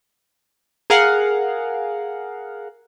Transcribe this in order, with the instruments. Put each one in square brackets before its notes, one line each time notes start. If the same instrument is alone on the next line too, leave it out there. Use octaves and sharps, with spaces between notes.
[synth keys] G#4 A#4 F5 F#5